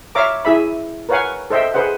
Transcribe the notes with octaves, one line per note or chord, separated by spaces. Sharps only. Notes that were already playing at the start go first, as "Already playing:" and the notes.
C#5 E5 F5 A#5 D6
E4 G#4 E5 B5
A#4 B4 C#5 F5 F#5 G#5
A4 C5 D#5 E5 G5
G#4 B4 C5 F#5